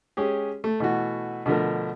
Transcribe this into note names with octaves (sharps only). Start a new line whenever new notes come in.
G#3 C#4 G4 G#4
A3
B2 E3 A3 F#4
B2 D3 F3 A3 A#4